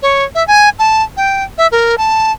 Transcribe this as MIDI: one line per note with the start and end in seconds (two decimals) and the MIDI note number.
0.02 0.24 73
0.35 0.46 76
0.48 0.69 80
0.79 1.03 81
1.17 1.44 79
1.58 1.67 76
1.72 1.95 70
1.98 2.32 81